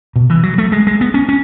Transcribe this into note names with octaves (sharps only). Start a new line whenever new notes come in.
B2
E3
F#3
A3
G#3
G#3
B3
C#4
C#4